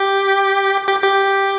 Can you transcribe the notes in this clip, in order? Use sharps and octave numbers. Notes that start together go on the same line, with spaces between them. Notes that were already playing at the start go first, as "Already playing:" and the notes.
Already playing: G4
G4
G4